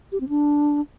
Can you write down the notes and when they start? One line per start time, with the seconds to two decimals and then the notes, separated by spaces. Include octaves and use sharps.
0.12 G4
0.20 C4
0.29 D4